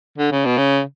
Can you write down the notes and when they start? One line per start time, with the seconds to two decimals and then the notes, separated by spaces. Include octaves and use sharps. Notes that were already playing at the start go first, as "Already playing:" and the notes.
0.19 D3
0.32 C#3
0.45 B2
0.58 C#3